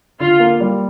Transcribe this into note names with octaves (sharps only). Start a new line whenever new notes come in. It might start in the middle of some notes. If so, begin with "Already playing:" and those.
D3 F4
A#3
G3